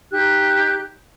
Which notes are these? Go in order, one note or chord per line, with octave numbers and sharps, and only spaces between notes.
D#4 G4 F#6 G6